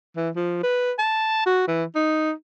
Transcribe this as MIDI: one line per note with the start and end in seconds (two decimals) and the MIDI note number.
0.16 0.30 52
0.36 0.62 53
0.63 0.92 71
0.99 1.45 81
1.46 1.65 66
1.67 1.84 52
1.95 2.32 63